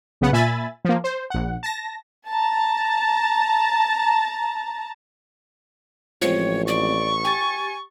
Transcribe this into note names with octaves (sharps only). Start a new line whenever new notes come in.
B1 C#3 B3 F#5
A#2 E5 G#5 B5 A6
F3 A#3
C5
A#1 F#5
A5 A#6
A5 A#5
A1 F3 G#3 C4 C#5
D5 C#6
G4 G#5 A6